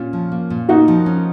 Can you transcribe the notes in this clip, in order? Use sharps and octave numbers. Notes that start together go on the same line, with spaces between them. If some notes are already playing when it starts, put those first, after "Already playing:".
Already playing: A#2 C#4 F4
F3
A#3
A#2
A#3 D#4 F#4
F3
C#4